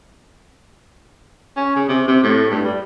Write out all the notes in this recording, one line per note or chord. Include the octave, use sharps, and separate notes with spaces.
C#4
C#3
C3
C3
A2
G2
G3